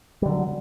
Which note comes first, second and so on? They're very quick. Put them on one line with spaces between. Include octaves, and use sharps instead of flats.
G3 D3 F#3